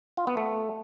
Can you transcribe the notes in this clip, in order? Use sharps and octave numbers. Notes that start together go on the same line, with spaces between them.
F4
B3
A3